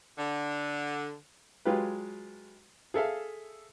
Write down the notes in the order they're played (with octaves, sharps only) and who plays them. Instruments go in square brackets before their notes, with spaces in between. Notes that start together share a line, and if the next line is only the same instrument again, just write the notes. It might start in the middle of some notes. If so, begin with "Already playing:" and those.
[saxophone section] D3
[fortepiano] F#3 G#3 F4 G4 B4
G#4 A4 E5 F5